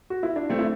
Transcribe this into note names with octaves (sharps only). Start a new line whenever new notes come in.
F#4
E4
D4
A3 C4
E4